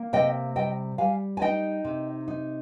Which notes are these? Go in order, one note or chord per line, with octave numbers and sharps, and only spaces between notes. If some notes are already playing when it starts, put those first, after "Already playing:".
Already playing: A#3
C3 D#5 G5
G3 D#5 G5
G3 F5 G#5
G#5
D#4 D#5 G5
C3
D#4